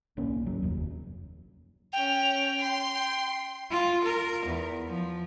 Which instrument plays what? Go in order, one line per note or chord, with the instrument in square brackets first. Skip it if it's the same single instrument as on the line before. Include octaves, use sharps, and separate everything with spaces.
[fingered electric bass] D1 B1 A#3 C#4
G#1 F#3
F1 D#2
[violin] C#4 F7 [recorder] G5
[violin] C6
[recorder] G5
[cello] F4
A#4
E2
F3